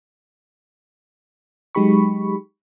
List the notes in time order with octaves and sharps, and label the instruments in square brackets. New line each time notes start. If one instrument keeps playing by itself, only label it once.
[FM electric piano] F#3 G#3 D#4 G4 B5 C#6